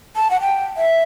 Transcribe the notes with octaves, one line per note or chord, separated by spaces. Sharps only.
A5
F#5
G5
E5